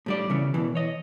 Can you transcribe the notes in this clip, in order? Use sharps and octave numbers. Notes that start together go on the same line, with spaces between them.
A2 G3 D5
C#3 E3 C#4
B2 E3
C#5 D#5